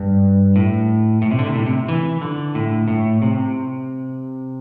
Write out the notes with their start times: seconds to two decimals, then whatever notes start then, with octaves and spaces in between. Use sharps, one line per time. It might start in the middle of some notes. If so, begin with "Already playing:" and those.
Already playing: G2
0.56 A2
1.22 A2
1.31 C3
1.39 D3
1.47 C3
1.55 A2
1.66 C3
1.88 E3
2.21 D3
2.55 A2
2.88 A2
3.22 C3